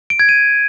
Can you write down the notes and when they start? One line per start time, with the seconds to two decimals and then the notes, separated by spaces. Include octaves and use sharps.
0.10 D7
0.19 G#6
0.29 D#7